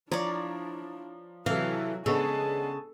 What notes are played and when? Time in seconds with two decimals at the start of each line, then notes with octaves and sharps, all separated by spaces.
0.12 F3 D4 E4 C#5 D5 A#5 A6
1.46 C3 E3 F#3 F#4 A4 F5
2.06 C#3 G#3 B3 D4 A4 G#5 A5